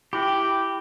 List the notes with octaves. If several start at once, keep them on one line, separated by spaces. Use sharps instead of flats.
E4 G4 G5 B5